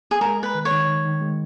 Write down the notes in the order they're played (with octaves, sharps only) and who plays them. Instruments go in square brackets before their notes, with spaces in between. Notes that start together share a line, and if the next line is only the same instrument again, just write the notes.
[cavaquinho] G#4
[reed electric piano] G#3 [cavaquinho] A#4
[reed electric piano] G#3 [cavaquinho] B4
[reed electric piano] D#3
[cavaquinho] C#5
[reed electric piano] D#3
D#3
D#3
G#3